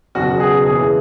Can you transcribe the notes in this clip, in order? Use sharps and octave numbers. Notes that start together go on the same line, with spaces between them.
F#1 E2 B2 F#3 F#4
G#4
E1 D#2 C#3 E3 G#4